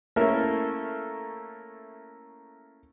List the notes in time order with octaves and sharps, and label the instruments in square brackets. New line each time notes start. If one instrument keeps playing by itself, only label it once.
[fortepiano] A3 A#3 C#4 E4 A4 A#4